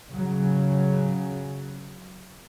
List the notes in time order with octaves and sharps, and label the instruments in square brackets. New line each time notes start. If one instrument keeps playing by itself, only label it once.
[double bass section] C#3 F#3